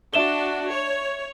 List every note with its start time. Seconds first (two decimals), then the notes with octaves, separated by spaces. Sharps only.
0.14 D4 F#4 E5 E7 G7
0.71 C#5